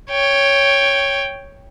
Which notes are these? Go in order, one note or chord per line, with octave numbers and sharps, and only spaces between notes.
C#5 G5